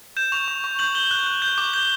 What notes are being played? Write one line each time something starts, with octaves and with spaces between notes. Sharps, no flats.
G6 E7
C#6 F7
C#6
C#6
G6 F#7
G6 G7
F#6
F#6
G6
D6
G6 G7